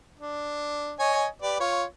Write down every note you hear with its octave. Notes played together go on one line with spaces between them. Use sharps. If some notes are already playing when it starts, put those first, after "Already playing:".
D4
C#5 D#5 G#5
G4 B4 D5
F4 C#5